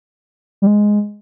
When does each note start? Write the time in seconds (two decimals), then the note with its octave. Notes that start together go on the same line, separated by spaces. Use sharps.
0.62 G3
0.67 G#3